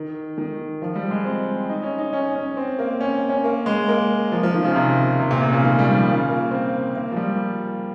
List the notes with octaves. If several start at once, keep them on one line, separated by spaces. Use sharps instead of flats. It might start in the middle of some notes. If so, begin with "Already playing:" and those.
Already playing: D#3
D#3
F3
G3
G#3
C4
D#4
C#4
D#4
C#4
C#4
C4
A#3
C#4
C#4
A#3
G#3
A#3
F3
F3
D#3
C#3
C3
C3
A#2
C3
C#3
D#3
G3
F3
C#3
A#3
C4
A#3
F3
G3